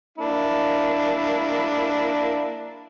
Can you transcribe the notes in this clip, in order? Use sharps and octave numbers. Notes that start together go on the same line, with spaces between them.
A#3 D4 E4